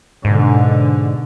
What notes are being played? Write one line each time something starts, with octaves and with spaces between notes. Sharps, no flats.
G#2 B2 D3